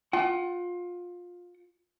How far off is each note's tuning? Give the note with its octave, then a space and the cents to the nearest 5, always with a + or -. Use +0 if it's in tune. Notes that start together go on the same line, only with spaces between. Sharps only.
F4 +20 F#5 +40